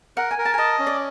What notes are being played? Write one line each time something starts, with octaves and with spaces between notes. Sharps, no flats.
A#4 F#5
G#5
A#4
A5
G#5
D#5 A5
C#4
D5